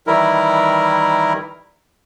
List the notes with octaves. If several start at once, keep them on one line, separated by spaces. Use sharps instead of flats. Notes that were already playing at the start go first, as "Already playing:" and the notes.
D#3 E3 G3 E4 A#4